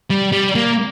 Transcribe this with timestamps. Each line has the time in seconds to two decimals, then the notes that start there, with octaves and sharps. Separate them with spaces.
0.10 G3
0.32 G3
0.55 A#3